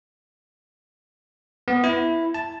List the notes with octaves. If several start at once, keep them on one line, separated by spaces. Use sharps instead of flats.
B3
E4
A5